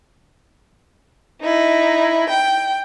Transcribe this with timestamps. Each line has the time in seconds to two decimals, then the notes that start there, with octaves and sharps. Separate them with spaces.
1.42 D#4 E4
2.29 G5